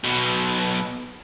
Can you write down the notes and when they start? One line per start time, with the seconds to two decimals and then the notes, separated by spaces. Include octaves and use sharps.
0.04 B1 B2